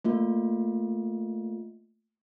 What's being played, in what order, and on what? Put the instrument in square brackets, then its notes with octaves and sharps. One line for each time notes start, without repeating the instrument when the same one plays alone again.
[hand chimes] A3 A#3 F4